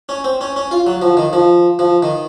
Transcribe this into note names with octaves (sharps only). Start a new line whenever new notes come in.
C#4
C4
C#4
C#4
F4
F#3
F3
D#3
F3
F3
D#3